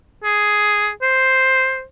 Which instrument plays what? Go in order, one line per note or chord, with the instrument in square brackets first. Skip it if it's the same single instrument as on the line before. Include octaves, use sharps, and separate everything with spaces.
[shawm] G#4
C5